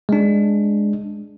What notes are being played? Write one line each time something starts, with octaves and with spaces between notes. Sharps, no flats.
G#3 D4